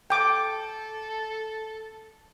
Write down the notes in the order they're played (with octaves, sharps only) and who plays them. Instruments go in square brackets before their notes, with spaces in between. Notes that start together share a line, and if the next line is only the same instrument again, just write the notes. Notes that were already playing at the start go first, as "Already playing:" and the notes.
[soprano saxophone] A4 [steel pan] G5 D6